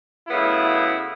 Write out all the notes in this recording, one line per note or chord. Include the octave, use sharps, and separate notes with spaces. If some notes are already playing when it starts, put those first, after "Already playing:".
F#2 C#3 A3 B3 E4